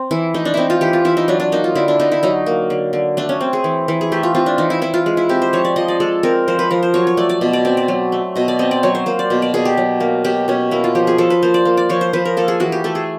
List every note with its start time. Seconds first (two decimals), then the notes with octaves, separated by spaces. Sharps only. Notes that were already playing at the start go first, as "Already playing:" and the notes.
Already playing: C4
0.11 E3 E4
0.34 A3 D#4
0.45 D4
0.54 C4 D#4 E4
0.70 F4
0.81 E3 G4
0.93 F4
1.05 E3 E4
1.17 D#4
1.28 F#3 D4
1.40 D4
1.52 A#3 D#4
1.64 F4
1.75 D3 E4
1.88 D4
2.00 D3 D#4
2.12 E4
2.23 F#3 D#4
2.46 A#3
2.70 D3
2.93 D3
3.17 A3 D4
3.29 C#4
3.41 C4
3.53 G#4
3.64 E3
3.88 E3
4.01 G#4
4.12 A3 G4
4.23 F4
4.35 C4 F4
4.46 D4
4.58 E3 D#4
4.70 E4
4.82 E3 E4
4.94 F4
5.06 G#3
5.17 E4
5.29 C4 G4
5.42 C5
5.53 F3 C#5
5.65 D5
5.76 F3 D#5
5.88 D5
6.00 G#3 A4
6.23 C4 A#4
6.48 F3 C5
6.59 B4
6.71 F3 A#4
6.83 C5
6.94 F#3 C#5
7.07 C#5
7.17 A3 D5
7.29 D5
7.41 B2
7.53 D5
7.65 C4 D5
7.77 D5
7.88 F#3
8.12 A3
8.36 B2 D#5
8.48 D5
8.59 C4 D#5
8.71 D5
8.83 F#3 C#5
8.95 C5
9.06 A#3 C5
9.19 D5
9.30 B2
9.42 D5
9.54 B2 G#4
9.65 G4
9.77 F#3
10.00 A#3
10.24 B2 G4
10.48 B2 C#4
10.71 A#3 E4
10.84 F4
10.95 F3 G4
11.07 G#4
11.18 F3 A4
11.30 B4
11.42 A#3 C5
11.54 D5
11.65 A#3
11.77 D5
11.89 F3 C#5
12.01 C5
12.13 F3 B4
12.25 A#4
12.37 A#3 A4
12.48 G#4
12.60 E3 F#4
12.72 G4
12.84 A3 A4
12.95 G#4